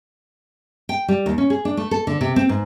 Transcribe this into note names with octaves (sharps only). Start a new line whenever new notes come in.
G5
G3
D#2
C#4
G#4
D4
A3
A4
D3
C3
C4
G#2